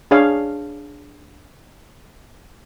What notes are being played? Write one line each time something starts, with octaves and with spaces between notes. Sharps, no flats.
D4 G#4 C#5 F5